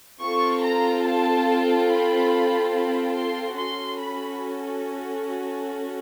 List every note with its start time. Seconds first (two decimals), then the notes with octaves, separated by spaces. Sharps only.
0.21 C4 F4 A4 C#6
0.63 A#5
1.05 A5
1.89 B5
2.73 B5
3.15 C6
3.57 C#4 F#4 A4 C6
4.00 B5